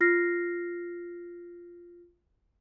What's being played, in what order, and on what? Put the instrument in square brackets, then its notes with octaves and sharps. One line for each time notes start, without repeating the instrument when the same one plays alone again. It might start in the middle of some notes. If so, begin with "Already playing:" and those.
[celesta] F4 F6 A#6 C7